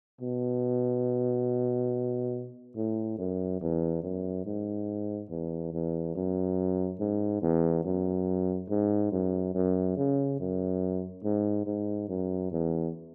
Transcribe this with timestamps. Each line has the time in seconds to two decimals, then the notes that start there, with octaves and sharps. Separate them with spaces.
0.21 B2
2.76 A2
3.18 F#2
3.62 E2
4.03 F#2
4.46 G#2
5.30 E2
5.73 E2
6.15 F#2
7.00 G#2
7.42 E2
7.85 F#2
8.70 G#2
9.12 F#2
9.55 F#2
9.97 C#3
10.40 F#2
11.24 G#2
11.67 G#2
12.09 F#2
12.52 E2